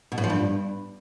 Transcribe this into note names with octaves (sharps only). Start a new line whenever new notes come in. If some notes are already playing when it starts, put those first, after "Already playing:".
B2
A2
F3
G2